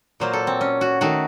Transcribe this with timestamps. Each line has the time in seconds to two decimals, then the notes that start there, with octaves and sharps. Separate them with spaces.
0.20 A#2 F#3 A#3 C5
0.33 A4
0.47 C4
0.61 C#4
0.81 F#4
1.01 D#3 A3 F#4